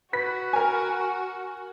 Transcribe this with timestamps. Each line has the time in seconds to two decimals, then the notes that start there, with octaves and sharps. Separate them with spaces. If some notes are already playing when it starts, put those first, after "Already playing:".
0.13 F#4 B4 B6
0.53 A#4 G#5